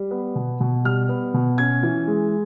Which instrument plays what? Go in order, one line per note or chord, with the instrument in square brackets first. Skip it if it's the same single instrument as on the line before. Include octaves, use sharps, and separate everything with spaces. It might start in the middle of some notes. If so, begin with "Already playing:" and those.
Already playing: [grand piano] G3
B3
B2
B2
G3 F6
B3
B2
C#4 G#6
E3
G#3